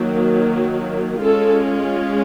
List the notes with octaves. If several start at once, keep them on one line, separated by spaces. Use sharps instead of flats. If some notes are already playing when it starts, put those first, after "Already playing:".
Already playing: D#3 F#3 A#3
G#3 C#4 F4 A4